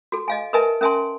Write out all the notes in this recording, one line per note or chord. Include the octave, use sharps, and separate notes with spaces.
F#4 A4
D#5 F5 G#5
A#4 B4 D#5 E5 G#5 A5
C#4 A#4 E5 G#5 A5 C6